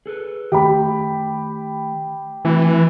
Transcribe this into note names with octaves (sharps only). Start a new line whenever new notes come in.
G#4 A4 B4
D#3 A3 G4 B5
E3 A3 C4 F#4